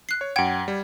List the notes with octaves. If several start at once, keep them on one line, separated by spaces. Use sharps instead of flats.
F#6 C7
C#5
F#2 F#5 G5 G#6
G3